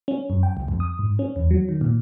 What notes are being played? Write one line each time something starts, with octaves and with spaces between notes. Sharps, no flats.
C#4
F#2
G5
C#2
F2
D#6
G#2
C#4
E2
F#3
D#3
A#2